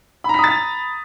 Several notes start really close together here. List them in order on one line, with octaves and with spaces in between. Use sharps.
B5 A#5 B6 D#6 A6